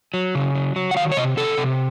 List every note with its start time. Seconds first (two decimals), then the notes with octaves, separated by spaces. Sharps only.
0.14 F#3
0.35 C#3
0.55 F#3
0.76 F#3
0.91 F#5
0.96 D#3 F5
1.12 C#5
1.17 C3 D#5
1.37 C3 A4
1.58 C3